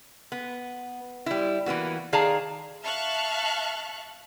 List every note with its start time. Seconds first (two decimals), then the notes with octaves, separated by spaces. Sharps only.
0.32 B3
1.26 G3 E4
1.66 E3 A#3 B3 F#4
2.13 D#3 G#4 D5 F5 A5 A#5
2.84 E5 F5 A5 C#6 F6 F#6